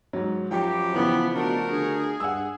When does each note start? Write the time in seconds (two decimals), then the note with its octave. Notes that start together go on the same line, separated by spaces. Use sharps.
0.13 G#2 F#3
0.51 F#2 F3 G3 G4 G5
0.94 C#3 E3 F3 B3
1.34 B2 A3 D4 F#4 A#4
1.71 D3 G#4
2.20 G2 F#5 G#5 E6